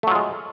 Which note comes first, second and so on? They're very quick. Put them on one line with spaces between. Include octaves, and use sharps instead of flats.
A3 F#3 F4 G#3